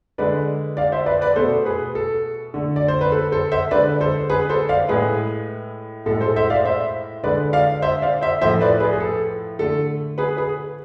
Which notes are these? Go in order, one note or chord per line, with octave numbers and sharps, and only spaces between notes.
D3 G#3 B4 D5
D5 F5
C5 E5
B4 D5
B4 D5
B2 A3 A4 C5
G#4 B4
A4
D3 A3
D5
C5
B4
A4
A4 C5
C5 E5
D3 G#3 B4 D5
A4 C5
G#4 B4
A4 C5
D5 F5
A2 G#3 G#4 B4
A2 G#3 A4
A4 C5
C5 E5
D5 F5
C5 E5
D3 G#3 B4 D5
D5 F5
C5 E5
D5 F5
C5 E5
A2 F3 A3 C5 E5
B4 D5
G#4 B4
G#4
A4
D3 A3 A4
G#4 B4
G#4 B4